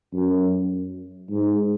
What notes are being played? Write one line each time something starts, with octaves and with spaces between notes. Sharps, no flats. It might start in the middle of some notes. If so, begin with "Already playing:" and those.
F#2
G#2